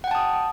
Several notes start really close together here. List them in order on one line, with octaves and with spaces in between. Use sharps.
F#5 G5 A5 D#6